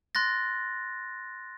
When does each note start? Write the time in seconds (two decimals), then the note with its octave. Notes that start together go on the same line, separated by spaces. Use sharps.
0.15 C6 F#6 A6 A#6